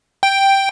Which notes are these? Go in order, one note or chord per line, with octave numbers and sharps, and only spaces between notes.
G5